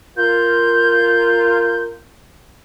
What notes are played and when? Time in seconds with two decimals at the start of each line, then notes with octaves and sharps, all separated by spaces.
0.17 F4 A#4 G6